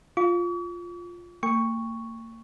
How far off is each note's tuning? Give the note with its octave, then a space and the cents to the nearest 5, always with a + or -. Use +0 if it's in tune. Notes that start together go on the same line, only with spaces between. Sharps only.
F4 +0 C#6 +45
A#3 -40 G5 +30 C#6 +0